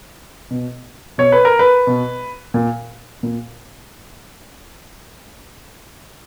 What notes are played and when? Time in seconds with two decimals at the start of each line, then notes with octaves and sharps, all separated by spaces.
0.51 B2
1.18 B2 C#5
1.32 B4
1.45 A#4
1.59 B4
1.87 B2
2.54 A#2
3.23 A#2